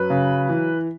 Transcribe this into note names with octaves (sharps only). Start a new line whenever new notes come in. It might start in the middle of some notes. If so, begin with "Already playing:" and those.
Already playing: F#2 F#3 B4
C#3
E3